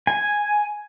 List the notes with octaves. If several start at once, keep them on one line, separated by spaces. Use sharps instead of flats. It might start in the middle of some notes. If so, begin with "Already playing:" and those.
G#5